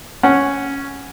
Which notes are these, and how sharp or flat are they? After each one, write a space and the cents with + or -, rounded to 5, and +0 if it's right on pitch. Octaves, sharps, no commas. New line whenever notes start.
C#4 +0 F#5 +0